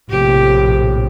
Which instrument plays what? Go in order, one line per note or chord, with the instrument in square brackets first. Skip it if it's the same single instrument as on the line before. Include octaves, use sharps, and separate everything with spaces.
[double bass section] A#1 A2 C3 [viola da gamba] G4